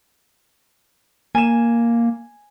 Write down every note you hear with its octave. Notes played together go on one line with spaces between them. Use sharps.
A#3 G#5 E7